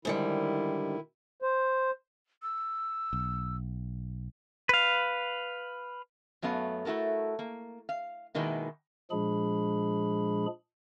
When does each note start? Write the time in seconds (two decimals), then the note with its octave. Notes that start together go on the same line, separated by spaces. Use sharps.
0.05 G#2 D3 D#3 G3 E4
1.42 C5
2.43 E6
3.13 B1
4.69 B4 F5
6.42 F#2 F#3 A3 B3 F5
6.85 A3 E4 F#4 A4 A#4
7.39 A#3
7.89 F5
8.35 B2 D#3 G#3 A#3 B3 E4
9.11 A#2 F3 G#3 D4 G#4 B5